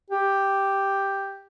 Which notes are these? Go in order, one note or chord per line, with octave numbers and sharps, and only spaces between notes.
G4